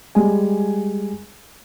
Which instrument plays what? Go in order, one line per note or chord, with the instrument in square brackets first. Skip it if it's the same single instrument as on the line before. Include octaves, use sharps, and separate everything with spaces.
[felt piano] G3 G#3 G#4 G#5